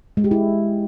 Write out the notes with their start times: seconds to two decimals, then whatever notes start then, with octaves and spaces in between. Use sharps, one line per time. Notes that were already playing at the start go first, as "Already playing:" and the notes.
0.17 G#3
0.24 G4
0.31 E4